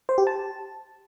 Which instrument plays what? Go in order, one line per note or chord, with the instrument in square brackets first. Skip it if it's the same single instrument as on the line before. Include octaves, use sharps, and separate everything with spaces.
[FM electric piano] C5
G4
A5